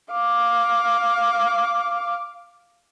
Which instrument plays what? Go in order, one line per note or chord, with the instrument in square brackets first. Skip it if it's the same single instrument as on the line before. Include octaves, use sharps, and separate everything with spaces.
[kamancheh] F5 D6